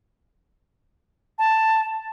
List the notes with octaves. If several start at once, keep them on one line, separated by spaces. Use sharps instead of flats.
A5